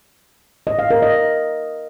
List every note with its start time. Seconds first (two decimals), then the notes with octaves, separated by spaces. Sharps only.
0.67 D#5
0.79 F5
0.91 A#4
1.02 D#5